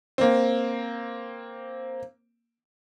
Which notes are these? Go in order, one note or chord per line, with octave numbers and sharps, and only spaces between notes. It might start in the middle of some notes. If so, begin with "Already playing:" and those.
A#3 C4